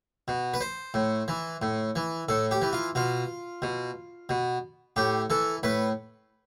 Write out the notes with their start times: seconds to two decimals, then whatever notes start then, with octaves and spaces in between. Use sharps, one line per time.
0.28 B2
0.54 B4
0.61 C5
0.94 A2
1.28 E3
1.62 A2
1.96 E3
2.29 A2 A4
2.51 G4
2.62 E3
2.73 F4
2.95 B2 F4
3.62 B2
4.29 B2
4.96 A2 G4
5.30 E3 A4
5.63 A2 B4